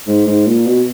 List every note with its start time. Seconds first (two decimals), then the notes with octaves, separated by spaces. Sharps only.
0.08 G#2
0.27 G#2
0.47 A#2
0.67 B2